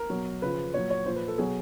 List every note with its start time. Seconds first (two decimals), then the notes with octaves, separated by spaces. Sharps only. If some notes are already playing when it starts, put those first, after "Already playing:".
Already playing: A#4
0.10 B2 F#3
0.42 C#3 F3 B4
0.74 A#2 F#3 C#5
0.90 C#5
1.06 A#2 F3 C5
1.16 B4
1.28 A4
1.38 B2 F#3 G#4